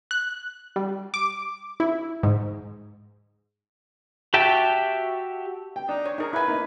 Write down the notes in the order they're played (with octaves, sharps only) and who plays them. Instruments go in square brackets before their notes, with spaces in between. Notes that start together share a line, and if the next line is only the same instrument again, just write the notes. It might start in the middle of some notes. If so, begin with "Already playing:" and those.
[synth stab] F#6
G3
D6
E4
G#2
[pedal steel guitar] F#4 G4 E5 G5 A5
[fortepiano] G5
[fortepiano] D4 [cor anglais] D#4
[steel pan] C#5
[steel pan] D#4 A#4 [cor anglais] G#4
[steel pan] E4 G#5 [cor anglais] B4
[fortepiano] A#3 D#4